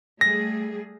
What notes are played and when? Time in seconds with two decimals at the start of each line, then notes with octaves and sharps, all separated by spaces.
0.21 G3 A3 G#4 A#6